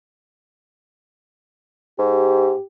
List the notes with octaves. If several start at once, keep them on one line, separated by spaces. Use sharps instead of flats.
G#2 G4